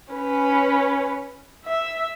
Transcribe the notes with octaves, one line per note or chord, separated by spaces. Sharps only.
C#4 B4
E5